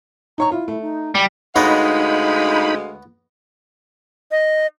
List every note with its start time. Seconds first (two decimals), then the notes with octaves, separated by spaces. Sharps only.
0.38 D#4 C#5 A#5 C#6
0.52 E4 F4
0.68 A3
0.81 D#4
1.15 G3
1.56 D2 G#3 B3 D#4 C#5 D#5 F5 B5
4.31 D#5